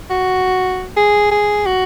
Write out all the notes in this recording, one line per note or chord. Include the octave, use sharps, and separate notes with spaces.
F#4
G#4
G#4
F#4